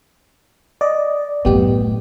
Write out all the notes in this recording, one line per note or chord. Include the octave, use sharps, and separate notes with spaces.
D5 D#5
F#2 A2 B3 G4